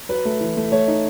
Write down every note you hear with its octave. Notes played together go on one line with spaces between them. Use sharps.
F#3 B4
A3
E3
A3
A3 C#5
D#4